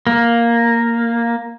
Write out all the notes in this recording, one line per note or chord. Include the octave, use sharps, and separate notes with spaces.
A#3